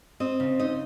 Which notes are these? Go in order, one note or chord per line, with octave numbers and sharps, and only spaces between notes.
C4 D#5
C#3
D#4 D#5